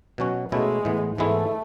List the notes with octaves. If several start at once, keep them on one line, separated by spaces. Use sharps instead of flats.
B2 F#3 C#4 F#4
B2 G#3 A3 C#4 E4
A2 E3 B3
G#2 E3 G#3 A3 B3 E4